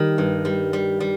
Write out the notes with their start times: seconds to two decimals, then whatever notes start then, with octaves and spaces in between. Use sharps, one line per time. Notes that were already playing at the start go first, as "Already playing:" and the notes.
Already playing: D#3 G3
0.18 G2
0.45 G3
0.73 G3
1.00 G3